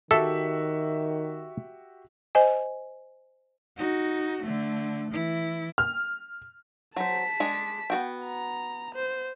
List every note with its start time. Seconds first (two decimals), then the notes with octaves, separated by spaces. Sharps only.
0.11 D#3 F#4 G4 A4 E5
2.35 C5 D#5 G#5
3.77 D#4 F#4
4.43 D3 A3
5.11 E3 E4
5.78 F6
6.96 F#3 C5 A5 B6
7.40 G#3 D4 G#4
7.90 B3 F#4 G5
8.26 A#5
8.95 C5